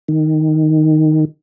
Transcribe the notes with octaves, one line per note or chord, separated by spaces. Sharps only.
D#3